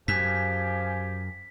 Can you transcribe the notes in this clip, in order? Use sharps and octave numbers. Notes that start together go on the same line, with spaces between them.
F#2 F3 G4 G#5 B6